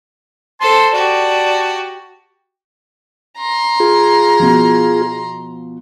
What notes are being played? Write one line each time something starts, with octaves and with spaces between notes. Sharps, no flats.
A4 C5 A5 C6
F#4 G4 D5
A#5 C6
F4 G#4
B2 F3